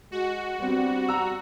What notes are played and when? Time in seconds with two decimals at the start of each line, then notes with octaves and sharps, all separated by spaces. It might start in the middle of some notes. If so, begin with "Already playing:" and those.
0.12 G#3 F#4
0.59 G3 B3 C4 D4
1.09 A#5 E6